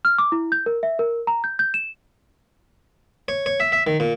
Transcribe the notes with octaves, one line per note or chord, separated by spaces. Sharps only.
F6
D6
E4
G6
A#4
E5
A#4
A#5
G6
G6
E7
C#5
C#5
E5
E5
D#3
A#2